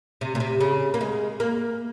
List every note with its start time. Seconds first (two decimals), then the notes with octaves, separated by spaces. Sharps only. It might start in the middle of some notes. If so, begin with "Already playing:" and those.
0.21 C3
0.35 A#2
0.40 C3
0.60 C#3
0.94 A#3
1.01 G#3
1.40 A#3